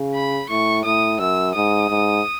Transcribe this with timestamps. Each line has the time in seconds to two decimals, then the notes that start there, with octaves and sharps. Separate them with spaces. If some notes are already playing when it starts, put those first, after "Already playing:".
Already playing: C#3
0.14 B5
0.49 A2 C#6
0.85 A2 D#6
1.19 F#2 E6
1.55 G#2 D#6
1.89 G#2